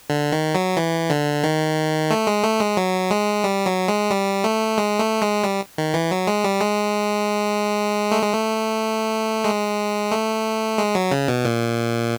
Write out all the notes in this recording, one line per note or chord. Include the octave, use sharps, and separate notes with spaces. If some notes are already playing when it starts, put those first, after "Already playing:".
D3
D#3
F#3
E3
D3
D#3
A3
G#3
A3
G#3
F#3
G#3
G3
F#3
G#3
G3
A3
G#3
A3
G#3
G3
D#3
E3
F#3
G#3
G3
G#3
A3
G#3
A3
G#3
A3
G#3
F#3
C#3
B2
A#2